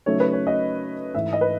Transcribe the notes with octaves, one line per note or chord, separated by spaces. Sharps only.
C#3 F#3 A3 D#4 C#5
B4
C#5
D#5
G#2 E3 A3 D#4 E5
D#5
B4